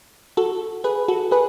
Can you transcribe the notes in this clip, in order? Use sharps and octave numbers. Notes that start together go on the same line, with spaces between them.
F#4 A4
G#4 B4
F#4 A4
G#4 B4